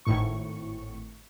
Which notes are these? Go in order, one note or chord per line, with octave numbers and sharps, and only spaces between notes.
G#1 A2 C#6